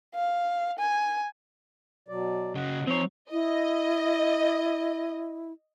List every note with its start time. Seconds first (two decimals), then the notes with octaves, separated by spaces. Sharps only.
0.15 F5
0.78 G#5
2.08 B2 F#3 D5
2.55 C#3 F#3 D#5 F#5
2.87 F3 C4 D#4 C#5
3.32 E4 D#5